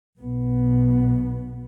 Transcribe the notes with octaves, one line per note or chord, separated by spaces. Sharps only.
B1 B2 B3